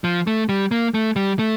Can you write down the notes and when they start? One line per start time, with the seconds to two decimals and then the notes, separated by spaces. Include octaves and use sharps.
0.04 F3
0.27 A3
0.49 G3
0.71 A#3
0.94 A3
1.16 G3
1.39 A3